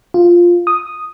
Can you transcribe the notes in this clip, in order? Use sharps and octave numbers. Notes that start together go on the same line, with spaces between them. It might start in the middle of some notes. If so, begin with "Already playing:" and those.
F4
D#6